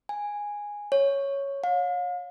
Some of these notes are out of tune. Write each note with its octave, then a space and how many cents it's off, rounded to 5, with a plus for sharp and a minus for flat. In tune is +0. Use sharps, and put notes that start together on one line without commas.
G#5 -10
C#5 +0
F5 +40